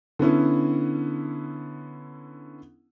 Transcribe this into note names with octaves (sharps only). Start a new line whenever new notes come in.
D3 B3 C#4 E4